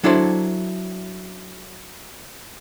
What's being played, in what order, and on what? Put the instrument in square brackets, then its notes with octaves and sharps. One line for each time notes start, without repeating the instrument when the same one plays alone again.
[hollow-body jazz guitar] F#3 D4 E4 A4 C5